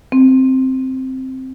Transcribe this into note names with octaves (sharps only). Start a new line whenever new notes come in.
C4